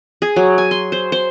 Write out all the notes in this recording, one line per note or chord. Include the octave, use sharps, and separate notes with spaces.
G#4
F#3
G#5
C6
C5
C5